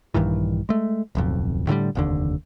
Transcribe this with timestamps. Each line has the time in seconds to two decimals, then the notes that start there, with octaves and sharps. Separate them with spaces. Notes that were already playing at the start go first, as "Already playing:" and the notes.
0.14 A#1 G2 D#3 E3
0.69 G#3 A3
1.15 D1 B1 F2
1.67 A2 D3 E3 G3
1.95 F1 D#2 D3